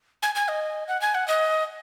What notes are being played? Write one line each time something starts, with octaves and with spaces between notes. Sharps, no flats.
G#5
G#5
D#5
F#5
G#5
F#5
D#5